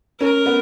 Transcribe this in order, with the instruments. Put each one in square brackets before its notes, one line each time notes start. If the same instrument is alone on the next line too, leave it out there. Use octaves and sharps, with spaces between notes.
[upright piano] C#4 [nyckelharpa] A#4
[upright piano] B3